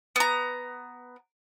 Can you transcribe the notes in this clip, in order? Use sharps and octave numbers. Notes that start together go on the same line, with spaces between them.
B3 A#5